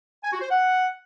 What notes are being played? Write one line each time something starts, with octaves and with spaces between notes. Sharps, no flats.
G#5
F#4
C5
F#5